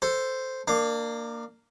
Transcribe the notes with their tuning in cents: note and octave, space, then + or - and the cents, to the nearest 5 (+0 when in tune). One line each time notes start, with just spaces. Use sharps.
A4 +5 C5 -5
A#3 -10 D4 +25